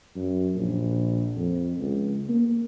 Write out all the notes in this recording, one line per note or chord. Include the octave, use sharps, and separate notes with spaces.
F#2
A#1
F2
C#2
A#3